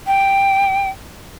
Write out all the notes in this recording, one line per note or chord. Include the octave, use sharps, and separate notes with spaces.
G5